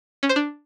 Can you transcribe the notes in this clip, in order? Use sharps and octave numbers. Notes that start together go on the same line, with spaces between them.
C#4
C5
D4